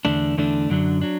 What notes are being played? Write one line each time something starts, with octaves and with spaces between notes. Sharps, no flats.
E2 D3 A3 D4
E2 D3 A3 D4
F#2 D3 F#3 D4
F#3 D4